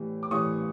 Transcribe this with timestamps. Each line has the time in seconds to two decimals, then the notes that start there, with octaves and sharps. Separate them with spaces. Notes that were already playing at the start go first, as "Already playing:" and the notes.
Already playing: A2 E3 G3
0.23 D6
0.31 A2 E3 G3 C#6 D#6